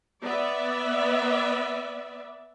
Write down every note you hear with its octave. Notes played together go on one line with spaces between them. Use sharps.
B3 D5 E5